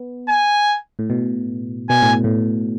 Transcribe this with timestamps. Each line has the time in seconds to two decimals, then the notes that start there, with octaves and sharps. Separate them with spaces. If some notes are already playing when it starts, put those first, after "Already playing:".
Already playing: B3
0.29 G#5
0.99 A2
1.10 B2
1.89 B2 G#5
2.02 A2
2.24 A2